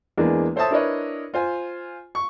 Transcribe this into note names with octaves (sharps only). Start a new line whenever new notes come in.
E2 G#3 A#3 B3 D4
A4 C5 C#5 E5 A5 D#6
D4 E4 A#4 B4 C#5 D#5
F4 C5 G#5
C#6